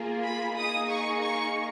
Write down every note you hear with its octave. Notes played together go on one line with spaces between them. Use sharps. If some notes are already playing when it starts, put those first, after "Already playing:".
Already playing: A#3 F4 G#4
B5
A#3 D#4 G#4 D#6
C#6
C#6